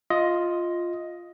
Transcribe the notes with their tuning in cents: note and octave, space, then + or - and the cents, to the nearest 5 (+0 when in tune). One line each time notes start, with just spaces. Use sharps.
F4 +0 D#5 +10